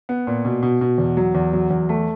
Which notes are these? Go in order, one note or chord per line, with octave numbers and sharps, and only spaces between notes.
B3
A#2
B2
B2
B2
E2
F#3
E2
F#3
E2
A3